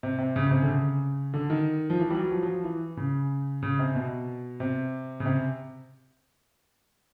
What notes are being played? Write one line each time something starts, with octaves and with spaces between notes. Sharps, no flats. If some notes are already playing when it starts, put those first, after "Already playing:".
C3
C3
C#3
C#3
C3
D3
C#3
D3
D#3
F3
E3
G3
F#3
F3
F#3
F3
E3
C#3
C#3
C3
B2
C3
C#3
C3